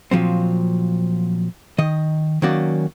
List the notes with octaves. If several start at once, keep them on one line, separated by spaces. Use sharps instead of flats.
A#2 F3 F#3 C4
D#3 D#5
D#3 F#3 A#3 C#4 F#4 D5